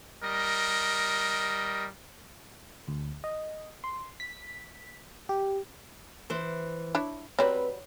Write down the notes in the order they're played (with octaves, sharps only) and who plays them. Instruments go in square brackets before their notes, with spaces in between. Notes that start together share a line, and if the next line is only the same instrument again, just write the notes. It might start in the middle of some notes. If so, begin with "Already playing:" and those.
[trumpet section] G3 A#4 D#5
[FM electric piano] D2
D#5
C6
B6
G4
[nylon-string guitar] E3 C5
[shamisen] D4 E4 C#5
[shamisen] F#3 G3 [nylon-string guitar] C4 B4 [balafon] C#5